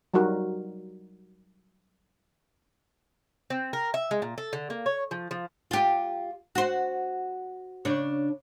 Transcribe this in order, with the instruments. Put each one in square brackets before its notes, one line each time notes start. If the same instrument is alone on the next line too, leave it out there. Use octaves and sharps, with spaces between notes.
[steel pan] F#3 G3 D#4 F#4 A#4
[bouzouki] C4
A#4
E5
G#3
A#2
A4
D3
A#3
C#5
F3
F3
[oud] F4 G4
F#4 C5
C#3 D4 C#5